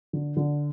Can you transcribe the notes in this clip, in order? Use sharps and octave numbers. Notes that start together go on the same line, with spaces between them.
D3
D3